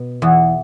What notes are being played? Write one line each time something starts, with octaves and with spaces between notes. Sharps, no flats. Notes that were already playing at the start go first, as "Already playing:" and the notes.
Already playing: B2
E2